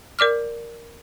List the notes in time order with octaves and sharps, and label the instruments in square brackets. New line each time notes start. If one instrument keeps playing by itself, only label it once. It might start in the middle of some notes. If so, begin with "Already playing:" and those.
[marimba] A#4 D5 D6 F6